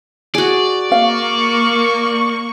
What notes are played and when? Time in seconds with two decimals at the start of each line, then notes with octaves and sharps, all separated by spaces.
0.35 F#4 G#4 D5
0.92 A#3 F5 C#6